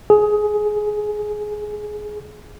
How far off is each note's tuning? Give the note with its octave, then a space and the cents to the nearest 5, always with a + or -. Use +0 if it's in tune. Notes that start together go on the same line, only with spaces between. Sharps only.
G#4 +15